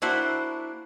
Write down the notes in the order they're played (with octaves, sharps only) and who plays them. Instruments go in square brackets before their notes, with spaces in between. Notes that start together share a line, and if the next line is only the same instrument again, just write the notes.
[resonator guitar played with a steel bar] A#3 D4 E4 F#4 C5